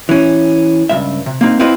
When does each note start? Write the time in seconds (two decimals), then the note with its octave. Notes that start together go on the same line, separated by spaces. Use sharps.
0.09 E3 C#4
0.89 C#2 G2 E5
1.26 C3
1.41 A#3 C4 D#4
1.59 C4 E4 F4 B4 D#5 G5